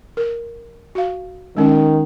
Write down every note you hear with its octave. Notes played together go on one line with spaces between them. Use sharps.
A#4
F#4 F5
D#3 G#3 C#4